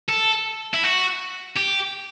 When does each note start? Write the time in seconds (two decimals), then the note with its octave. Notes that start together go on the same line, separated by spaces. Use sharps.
0.09 A4
0.74 E4
0.83 F#4
1.57 G4